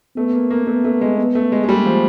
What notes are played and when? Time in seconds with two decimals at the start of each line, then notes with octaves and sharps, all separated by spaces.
0.16 A3 B3
0.33 A#3
0.51 A#3
0.67 A3 B3
0.85 A3
1.01 G#3
1.18 B3
1.35 A3
1.52 G#3
1.64 G#3
1.68 G3 A#3
1.86 F3